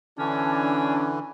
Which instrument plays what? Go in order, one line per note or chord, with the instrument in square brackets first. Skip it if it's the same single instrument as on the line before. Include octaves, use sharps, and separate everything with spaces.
[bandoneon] D3 E3 [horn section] C#4 D4